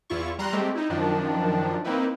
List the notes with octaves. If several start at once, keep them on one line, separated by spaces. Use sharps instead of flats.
E2 E4 F4 C#6
G3 A#5 C6 F#6
G#3 A3 C4 G4
D#4 E4
F#2 D#3 F3 D4
A#3 C4 D#4 E4 B4